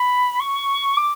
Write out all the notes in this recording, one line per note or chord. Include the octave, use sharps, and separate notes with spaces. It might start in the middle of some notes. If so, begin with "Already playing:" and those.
Already playing: B5
C#6
D6